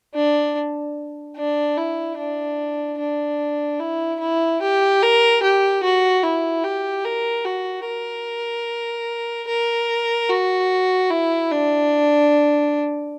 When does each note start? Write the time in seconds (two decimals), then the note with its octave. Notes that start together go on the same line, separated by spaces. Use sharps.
0.15 D4
1.37 D4
1.78 E4
2.19 D4
2.99 D4
3.80 E4
4.20 E4
4.62 G4
5.03 A#4
5.43 G4
5.84 F#4
6.24 E4
6.64 G4
7.05 A#4
7.45 F#4
7.87 A#4
9.48 A#4
10.29 F#4
11.10 E4
11.52 D4